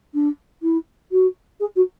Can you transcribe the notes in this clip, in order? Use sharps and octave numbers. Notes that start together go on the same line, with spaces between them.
D4
E4
F#4
G#4
F#4